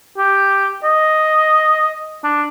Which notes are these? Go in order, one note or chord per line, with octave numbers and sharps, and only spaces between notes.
G4
D#5
D4